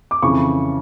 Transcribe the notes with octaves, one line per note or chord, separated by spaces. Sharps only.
D6
F2 C#3 E3 C#6